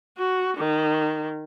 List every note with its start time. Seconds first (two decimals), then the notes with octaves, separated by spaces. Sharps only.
0.18 F#4
0.57 D#3